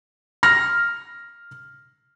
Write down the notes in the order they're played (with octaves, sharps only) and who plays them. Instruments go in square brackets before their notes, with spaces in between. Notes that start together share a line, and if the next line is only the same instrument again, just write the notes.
[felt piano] F6 A#6